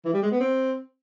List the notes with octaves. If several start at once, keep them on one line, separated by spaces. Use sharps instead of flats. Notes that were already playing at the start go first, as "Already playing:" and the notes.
E3
G3
G#3
B3
C4